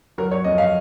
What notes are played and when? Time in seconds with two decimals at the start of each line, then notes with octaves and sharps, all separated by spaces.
0.18 F#3 A#4
0.31 C#5
0.44 F2 D#5
0.58 F5